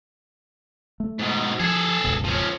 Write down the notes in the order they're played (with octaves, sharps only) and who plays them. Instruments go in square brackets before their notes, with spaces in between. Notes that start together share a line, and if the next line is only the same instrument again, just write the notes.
[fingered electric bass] A3
[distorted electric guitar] G#2 B2
[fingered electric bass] F3 [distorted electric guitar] G#4 A4
[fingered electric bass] F#1 C#2 B2
[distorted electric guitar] F3 C#4